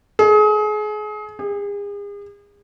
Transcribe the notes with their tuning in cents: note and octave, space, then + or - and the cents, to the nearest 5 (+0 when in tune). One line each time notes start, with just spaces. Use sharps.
G#4 +30
G#4 -40